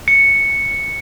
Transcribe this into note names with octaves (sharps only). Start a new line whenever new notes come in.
C#7